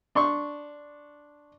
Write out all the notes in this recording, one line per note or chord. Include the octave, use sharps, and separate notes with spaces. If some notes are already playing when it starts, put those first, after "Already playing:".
D4 C6 C#6